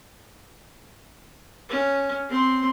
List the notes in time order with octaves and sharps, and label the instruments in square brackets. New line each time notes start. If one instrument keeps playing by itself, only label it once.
[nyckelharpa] C#4
C4 C6